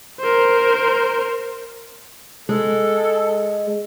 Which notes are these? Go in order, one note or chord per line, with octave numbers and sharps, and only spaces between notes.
A#4 C5
G#3 A4